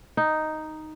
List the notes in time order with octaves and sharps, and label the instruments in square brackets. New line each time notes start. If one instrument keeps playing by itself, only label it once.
[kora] D#4